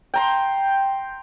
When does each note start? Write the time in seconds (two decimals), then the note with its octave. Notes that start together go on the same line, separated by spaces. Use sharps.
0.14 G5 A#5 C6